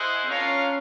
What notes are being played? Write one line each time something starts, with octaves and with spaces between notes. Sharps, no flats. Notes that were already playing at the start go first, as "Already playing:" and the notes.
Already playing: E4 G#4 C5 D#5 F#5
C#4 D4 F4 A#4 C#5 F5